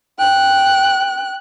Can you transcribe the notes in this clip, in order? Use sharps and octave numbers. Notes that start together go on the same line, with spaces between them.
G5 F#6